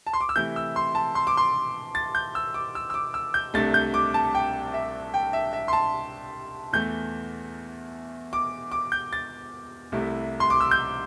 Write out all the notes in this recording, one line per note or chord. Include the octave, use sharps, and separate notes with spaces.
A5
C6
D6
E6
C3 E3 A3 E4 G6
E6
C6
A5
C6
D6
C6
A6
G6
E6
D6
E6
E6
D6
E6
G6
C2 C3 A3 D4 A6
G6
D6
A5
G5
E5
G5
E5
E5
C6
A5
E2 E3 A3 G6
D6
D6
G6
A6
C2 C3 A3 E4
C6
D6
E6
G6